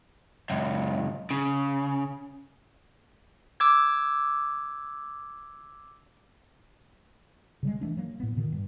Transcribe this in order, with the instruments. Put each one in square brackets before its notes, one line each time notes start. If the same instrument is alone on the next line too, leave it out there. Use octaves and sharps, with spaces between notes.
[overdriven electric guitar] C#2 F#2
C#3
[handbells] D6 E6 G#6
[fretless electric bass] C#3 G3 G#3
E3 A3 D4
F#3 A#3
A2 B3
A#2 D3 D#3
G2